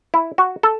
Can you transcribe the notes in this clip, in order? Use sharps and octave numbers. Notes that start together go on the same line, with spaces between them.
E4
F#4
A4